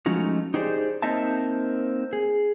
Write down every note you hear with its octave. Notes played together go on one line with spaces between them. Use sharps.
F3 G#3 A3 C#4 D#4 F#4
D#4 G4 G#4 C5 D5
A#3 C4 D#4 D#5 E5 A5
G#4